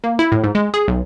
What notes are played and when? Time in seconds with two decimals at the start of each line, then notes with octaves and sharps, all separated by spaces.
0.04 A#3
0.19 E4
0.32 A2
0.43 G#2
0.55 G#3
0.74 G#4
0.88 B1